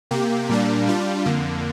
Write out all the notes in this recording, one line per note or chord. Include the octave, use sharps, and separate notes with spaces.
C3 A#3 G4
A#2 G3 A#3 D4
G3 D4 F4
F2 D3 A#3